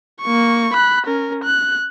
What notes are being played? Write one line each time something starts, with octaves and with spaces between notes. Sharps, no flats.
A#3 C#6
B5 F#6
C#4 A#4
F#6